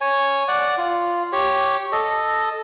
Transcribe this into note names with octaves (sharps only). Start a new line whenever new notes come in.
C#5 G#5
D5 F#5
F4
G4 C#5
A4 D#5